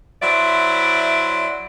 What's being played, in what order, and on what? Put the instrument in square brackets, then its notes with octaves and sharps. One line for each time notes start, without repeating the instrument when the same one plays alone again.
[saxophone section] F#3 E4 C5 D5 E5